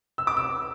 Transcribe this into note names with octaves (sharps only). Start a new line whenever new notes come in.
E6
D6
E6